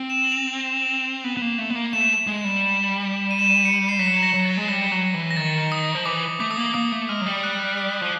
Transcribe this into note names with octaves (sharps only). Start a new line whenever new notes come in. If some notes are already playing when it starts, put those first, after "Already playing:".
Already playing: C4
E7
F#7
F7
B3
B3
A#3
A3
B3
A#3
A3 E7
G#3
G3
D#7
E7
D#7
C#7
C7
F#3 B6
A#6
F#3 A#6
A6
G#3
G3 A#6
F#3
E3
A#6
D#3 A6
D#6
F3
E3 D6
A3 D6
D#6
A#3 D6
A#3 D#6
A3
G#3 F6
F#3
G3
F#6
F#6
F3